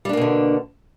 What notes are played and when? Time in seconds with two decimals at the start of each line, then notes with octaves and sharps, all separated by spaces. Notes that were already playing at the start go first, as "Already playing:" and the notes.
0.05 G3
0.09 D4
0.13 A#3
0.17 B2
0.21 D3